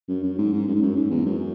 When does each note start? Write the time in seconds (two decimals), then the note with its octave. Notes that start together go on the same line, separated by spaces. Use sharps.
0.08 F#2
0.23 F#2
0.38 G#2
0.53 G#2
0.67 F#2
0.75 G#2
0.82 F#2
0.96 G#2
1.11 E2
1.26 F#2